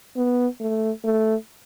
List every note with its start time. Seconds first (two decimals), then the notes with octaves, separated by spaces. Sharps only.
0.16 B3
0.60 A3
1.04 A3